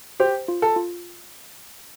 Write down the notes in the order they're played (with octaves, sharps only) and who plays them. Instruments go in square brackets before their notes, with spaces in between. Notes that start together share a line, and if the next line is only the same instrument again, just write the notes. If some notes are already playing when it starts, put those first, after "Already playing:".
[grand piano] G4 [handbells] C5
[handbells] F4
[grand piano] A4
[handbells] F4